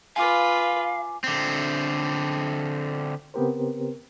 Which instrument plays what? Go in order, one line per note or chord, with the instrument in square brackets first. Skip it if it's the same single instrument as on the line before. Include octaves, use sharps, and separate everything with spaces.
[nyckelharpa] F4 B4 [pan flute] F5 [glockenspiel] G#5 D6
[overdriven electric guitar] D3 C4
[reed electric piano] C#3 B3 C4 G4 A#4 C5